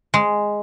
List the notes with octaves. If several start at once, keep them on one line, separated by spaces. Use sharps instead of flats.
G#3